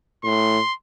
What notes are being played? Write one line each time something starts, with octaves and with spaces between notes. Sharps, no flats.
A2 C6